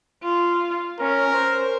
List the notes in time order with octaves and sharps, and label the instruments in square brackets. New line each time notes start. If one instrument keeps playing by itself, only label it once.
[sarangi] F4
[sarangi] C#4 [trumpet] A#4
[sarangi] C5